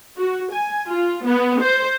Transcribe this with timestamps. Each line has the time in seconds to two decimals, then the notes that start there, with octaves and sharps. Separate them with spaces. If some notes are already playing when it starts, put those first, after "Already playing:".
0.18 F#4
0.53 G#5
0.89 F4
1.26 B3
1.62 C5